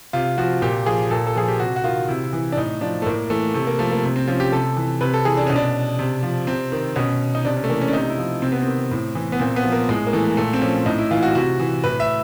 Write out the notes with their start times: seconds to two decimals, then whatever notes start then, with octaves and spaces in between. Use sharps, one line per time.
0.13 C3 F4
0.38 F3 F#4
0.62 A#2 G4
0.86 F3 G#4
1.11 A#2 A4
1.27 A4
1.35 F3 G#4
1.48 G4
1.59 C3 F#4
1.76 F#4
1.84 D#3 F4
2.08 C3 E4
2.33 E3
2.52 D4
2.57 A2 D#4
2.81 F3 D4
3.02 A3
3.06 A2 A#3
3.30 E3 A3
3.54 C3 A3
3.67 A#3
3.79 F3 A3
3.92 A#3
4.03 C3
4.16 C4
4.28 F3 C#4
4.40 G4
4.52 C3 A4
4.77 E3
5.01 C3 B4
5.14 A4
5.25 E3 G#4
5.37 D4
5.47 B2 C#4
5.56 D4
5.99 C3
6.23 F3
6.47 C3 C4
6.72 D#3
6.96 B2 C#4
7.35 D#4
7.45 C3 D4
7.57 C#4
7.64 A3
7.69 E3 A#3
7.81 C#4
7.88 D4
7.93 C3 D#4
8.10 E4
8.18 F3
8.42 C3 C4
8.52 B3
8.62 D#3 C4
8.91 A2
9.15 E3
9.32 B3
9.40 A#2 C4
9.56 B3
9.64 F3
9.72 A#3
9.89 A2 G#3
10.07 A#3
10.13 E3 A3
10.37 A#2 A3
10.53 C4
10.62 F3 C#4
10.86 A2 D#4
10.98 E4
11.11 E3 F4
11.23 F#4
11.35 C3 F#4
11.59 E3
11.84 A2 B4
12.00 E5